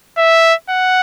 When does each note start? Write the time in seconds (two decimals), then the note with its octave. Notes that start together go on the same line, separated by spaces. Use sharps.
0.18 E5
0.70 F#5